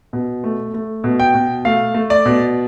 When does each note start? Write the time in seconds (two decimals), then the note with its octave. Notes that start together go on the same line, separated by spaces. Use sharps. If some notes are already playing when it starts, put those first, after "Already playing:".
0.13 B2
0.44 A3
0.74 A3
1.04 B2
1.20 G5
1.34 B2
1.65 A3 F5
1.94 A3
2.10 D5
2.25 B2